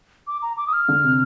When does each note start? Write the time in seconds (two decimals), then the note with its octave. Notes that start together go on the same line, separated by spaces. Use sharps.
0.27 D6
0.42 A#5
0.57 D6
0.67 D#6
0.73 F6
0.88 D3
1.04 C3